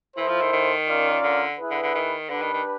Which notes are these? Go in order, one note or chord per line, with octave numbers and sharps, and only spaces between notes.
E3 E4 A4 C5
F3
D#3
D#3
C#4 F4 A#4 D5 F5
D3
E4 G#4 B4
D3
D3
D#3
D3 D4 G4 B4
D#3
D#3